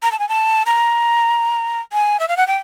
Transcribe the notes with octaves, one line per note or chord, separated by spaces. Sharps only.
A#5
A5
G#5
A5
A#5
G#5
E5
F5
F#5
G5